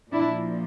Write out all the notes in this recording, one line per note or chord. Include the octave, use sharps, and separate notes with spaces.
A#2 F3 D4 E4